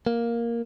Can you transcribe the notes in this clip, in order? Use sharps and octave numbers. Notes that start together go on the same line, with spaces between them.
A#3